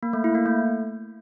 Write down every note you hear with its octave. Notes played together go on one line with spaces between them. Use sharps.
A#3
A3
E4
A#3
A3